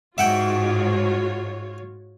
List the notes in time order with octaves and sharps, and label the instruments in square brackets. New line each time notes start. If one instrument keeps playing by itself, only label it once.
[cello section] G#2 [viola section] F4 F#4 C#5 [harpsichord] E5 F#5 G5